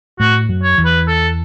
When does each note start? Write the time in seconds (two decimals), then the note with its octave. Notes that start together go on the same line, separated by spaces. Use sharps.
0.20 A2 A3 F#4
0.49 F#2 F#3
0.63 C#5
0.78 E2 E3
0.85 B4
1.08 A4